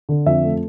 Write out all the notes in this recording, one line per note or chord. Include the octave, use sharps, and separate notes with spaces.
D3
F2 E5
A3